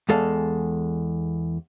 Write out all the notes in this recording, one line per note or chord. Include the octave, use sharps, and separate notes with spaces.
E2 G#3 A4 F5